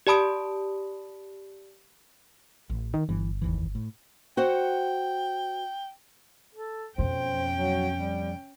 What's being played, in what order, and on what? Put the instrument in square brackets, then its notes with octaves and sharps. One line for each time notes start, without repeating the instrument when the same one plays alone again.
[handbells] G4 D5 A5 B5 D#6 D7
[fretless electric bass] A1
[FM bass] D#3
[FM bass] G1 [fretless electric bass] E3
[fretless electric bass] F1 D#2 E3
A2
[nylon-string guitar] F#4 C5 F#5 [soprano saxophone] G5
[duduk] A4
[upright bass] F2 B2 [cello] C#4 G5 [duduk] C5
[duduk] F#3
G3